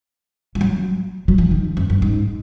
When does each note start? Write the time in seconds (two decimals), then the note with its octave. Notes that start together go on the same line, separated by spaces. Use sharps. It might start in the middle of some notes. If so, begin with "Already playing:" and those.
0.55 F3
0.61 F#3
1.28 F#3
1.38 F3
1.51 D#3
1.77 F#2
1.90 F#2
2.02 G#2